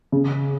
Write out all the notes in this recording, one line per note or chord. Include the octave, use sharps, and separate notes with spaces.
C#3